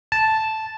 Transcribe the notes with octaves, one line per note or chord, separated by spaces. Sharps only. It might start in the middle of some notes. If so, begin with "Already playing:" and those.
A5